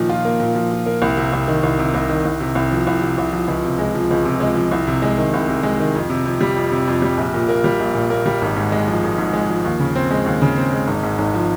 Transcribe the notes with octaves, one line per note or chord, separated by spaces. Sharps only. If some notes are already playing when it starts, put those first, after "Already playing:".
Already playing: A#2 D#3 F3
F4
A#3
A#2
F3
F4
A#3
C2
C3
C2
D#3
C2
C3
C2
D#3
C2
C3
C2
F3
C2
C3
C2
F3
C#2
C3
G#3
F3
C#2
C3
G#3
F3
C2
C3
G#3
D#3
C2
C3
G#3
D#3
F2
C3
F2
G3
F2
C3
F2
G3
A#1
A#2
A#3
G3
A#1
A#2
A#3
G3
G#1
G#2
G#3
F3
G#1
G#2
G#3
F3
D#2
C#3
C4
G#3
D#2
C#3
C4
G#3
G#1
G#2
G#1
F3